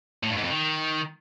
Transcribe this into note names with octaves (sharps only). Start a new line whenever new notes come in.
A2
G2
G#2
F2
D#3